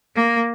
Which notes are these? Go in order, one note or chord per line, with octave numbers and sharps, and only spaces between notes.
A#3